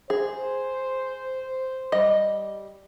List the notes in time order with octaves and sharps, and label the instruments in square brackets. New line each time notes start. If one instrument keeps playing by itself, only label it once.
[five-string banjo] G#4 [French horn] C5
[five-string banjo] G3 D#5